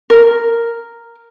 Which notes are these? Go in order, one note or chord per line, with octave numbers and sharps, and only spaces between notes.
A#4